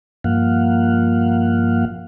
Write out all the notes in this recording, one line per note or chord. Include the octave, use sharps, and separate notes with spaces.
G2 A#2 F3 A#3 F5 F#5